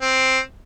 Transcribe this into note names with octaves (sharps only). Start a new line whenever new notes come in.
C4